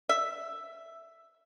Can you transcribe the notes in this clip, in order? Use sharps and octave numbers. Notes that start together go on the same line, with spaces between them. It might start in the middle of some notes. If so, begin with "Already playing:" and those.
E5